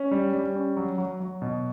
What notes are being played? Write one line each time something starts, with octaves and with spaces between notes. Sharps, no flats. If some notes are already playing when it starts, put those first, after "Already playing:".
Already playing: C#4
G3
G3
C#4
F#3
F#3
F#3
B2